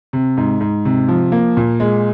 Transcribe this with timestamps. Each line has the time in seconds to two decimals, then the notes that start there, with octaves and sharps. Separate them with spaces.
0.13 C3
0.37 G#2
0.61 G#2
0.85 C3
1.08 F3
1.32 A#3
1.57 A#2
1.80 G#3